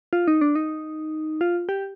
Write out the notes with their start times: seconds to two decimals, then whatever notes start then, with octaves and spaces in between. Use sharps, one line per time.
0.13 F4
0.28 D#4
0.41 D4
0.55 D#4
1.41 F4
1.69 G4